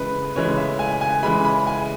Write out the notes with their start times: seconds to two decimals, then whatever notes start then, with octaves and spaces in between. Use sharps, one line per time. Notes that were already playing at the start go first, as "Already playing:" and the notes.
Already playing: C#3 E3 G#3 B4
0.35 C#3 E3 G#3 C#5
0.57 E5
0.79 G#5
1.01 G#5
1.23 C#3 E3 G#3 B5
1.45 B5
1.67 G#5